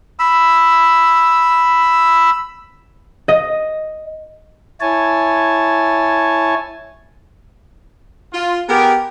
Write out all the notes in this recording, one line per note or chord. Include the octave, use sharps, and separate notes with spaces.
B5 E6
D#5
E4 C#5 G#5 A5
F4
B3 G4 G#4 A#4